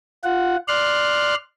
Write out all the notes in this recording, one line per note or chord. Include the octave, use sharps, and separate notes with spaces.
F4 F#5
D5 C6 F6 F#6